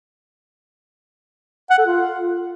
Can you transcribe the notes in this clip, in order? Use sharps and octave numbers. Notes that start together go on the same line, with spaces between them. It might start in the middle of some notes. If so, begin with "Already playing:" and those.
F#5
A4
F4